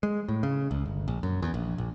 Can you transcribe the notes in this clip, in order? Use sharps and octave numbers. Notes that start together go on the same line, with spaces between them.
G#3
A2
C#3
C#2
G1
A#1
F#2
E2
A#1
A#1